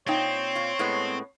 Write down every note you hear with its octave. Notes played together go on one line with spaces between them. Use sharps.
A#2 C4 D#4 C#5 G5
A#2 F4
A2 G#3 B3